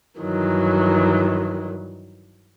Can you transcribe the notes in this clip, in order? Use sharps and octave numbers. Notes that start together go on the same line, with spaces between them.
G2 D#3 E3 F#3